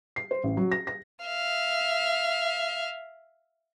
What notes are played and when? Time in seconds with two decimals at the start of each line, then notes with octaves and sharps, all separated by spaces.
0.16 C7
0.31 C5
0.44 A1
0.57 F#3
0.72 A#6
0.87 A#6
1.26 E5 F5